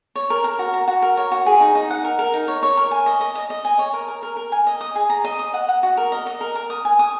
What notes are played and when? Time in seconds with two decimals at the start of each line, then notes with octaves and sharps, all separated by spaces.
0.15 C#5
0.30 A#4
0.44 A#4
0.59 F#4
0.74 A#5
0.88 F#4
1.02 A#4
1.17 C#5
1.32 F#4
1.46 G#4
1.60 D#4
1.75 D#4
1.90 F#5
2.04 A#4
2.19 A#4
2.34 D#4
2.48 C#5
2.63 C#5
2.77 A#4
2.91 G#5
3.06 D#5
3.21 D#5
3.35 D#5
3.50 D#5
3.65 G#5
3.79 C#5
3.93 A#4
4.08 A#4
4.23 A#4
4.37 A#4
4.52 G#5
4.67 D#5
4.81 D#6
4.95 G#4
5.10 A#5
5.24 D#5
5.39 D#6
5.54 F#5
5.69 F#5
5.83 F#4
5.97 A#4
6.12 D#5
6.27 D#5
6.41 A#4
6.55 A#4
6.70 D#6
6.85 G#5
6.99 D#6